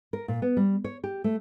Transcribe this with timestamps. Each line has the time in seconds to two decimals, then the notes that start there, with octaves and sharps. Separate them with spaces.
0.13 A#4
0.28 A#2
0.42 B3
0.57 G3
0.84 C#5
1.04 G4
1.24 A3